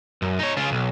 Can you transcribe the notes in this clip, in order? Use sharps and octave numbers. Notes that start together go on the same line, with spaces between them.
F#2
D#4 C#5
C#3 F4
B1